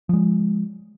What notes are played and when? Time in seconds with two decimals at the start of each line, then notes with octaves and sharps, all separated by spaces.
0.09 F3 G#3